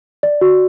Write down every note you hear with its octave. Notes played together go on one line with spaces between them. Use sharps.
D5
F#4